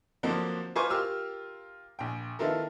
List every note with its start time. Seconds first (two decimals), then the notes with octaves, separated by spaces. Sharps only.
0.23 D3 F3 F#3 A#3 C4 D4
0.76 F4 B4 C5 G#5 C#6 D6
0.90 F4 G4 A#4 E6 F6
1.99 A#1 G5
2.39 D#3 B3 E4 F4 A4 A#4